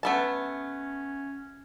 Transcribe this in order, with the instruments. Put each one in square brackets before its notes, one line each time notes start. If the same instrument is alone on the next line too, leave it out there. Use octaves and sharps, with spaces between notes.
[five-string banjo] A3 B3 A5 [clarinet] C#4